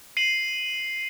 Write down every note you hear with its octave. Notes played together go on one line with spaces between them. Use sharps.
C7 D#7 F#7